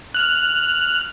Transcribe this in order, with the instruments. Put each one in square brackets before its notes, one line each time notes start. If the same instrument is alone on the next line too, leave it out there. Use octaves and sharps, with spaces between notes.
[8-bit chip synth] F6 F#6